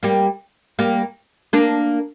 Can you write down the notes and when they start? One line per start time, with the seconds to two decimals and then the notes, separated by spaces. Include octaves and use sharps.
0.03 G3 A#3
0.79 G3 A#3
1.53 A#3 D4